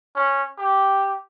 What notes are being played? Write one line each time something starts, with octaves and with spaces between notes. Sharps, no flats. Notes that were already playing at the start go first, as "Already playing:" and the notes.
C#4
G4